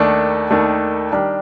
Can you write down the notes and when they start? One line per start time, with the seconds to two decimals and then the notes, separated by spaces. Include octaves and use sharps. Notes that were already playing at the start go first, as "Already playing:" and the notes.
Already playing: D#2 D#3 A3 D4
0.50 D#2 D#3 A3 D4
1.12 D#3 G3 D4 G4 A#4